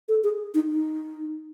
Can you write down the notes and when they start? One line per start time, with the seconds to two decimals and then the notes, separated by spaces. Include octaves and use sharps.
0.09 A4
0.24 G#4
0.54 D#4
0.70 D#4